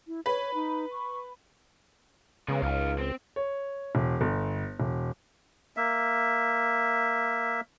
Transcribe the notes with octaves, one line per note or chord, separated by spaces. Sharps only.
E4
B4 C#5
D#4
C#6
C#3 G#3 B3
C#2 D#4 F5
C4
C#5
E1
G1
E1
A#3 E5